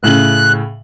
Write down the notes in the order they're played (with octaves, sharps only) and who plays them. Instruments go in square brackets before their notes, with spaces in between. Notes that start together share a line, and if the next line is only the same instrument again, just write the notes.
[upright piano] A2 C#3 F#7 [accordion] F#6